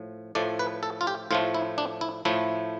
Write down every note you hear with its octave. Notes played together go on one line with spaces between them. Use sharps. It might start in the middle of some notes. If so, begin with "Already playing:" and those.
Already playing: A2 F3
A2 F3 A3 D5
B4
A4
F4
G4
A2 F3 A3 F4
E4
D4
E4
A2 F3 A3 E4